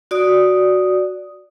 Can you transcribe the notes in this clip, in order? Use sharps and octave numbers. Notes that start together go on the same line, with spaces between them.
F#4 D5 D#6